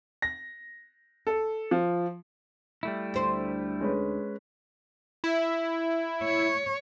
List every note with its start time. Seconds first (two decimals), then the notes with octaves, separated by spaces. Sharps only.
0.22 A#6
1.27 A4
1.71 F3
2.83 G3 A3 E4
3.14 D2 C5
3.81 G#3 C#4 B4
5.24 E4
6.24 C#5